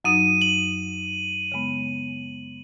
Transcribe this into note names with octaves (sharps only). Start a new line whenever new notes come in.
F#2 F#3 D#4 D#7
F#7
C#3 G#3 B3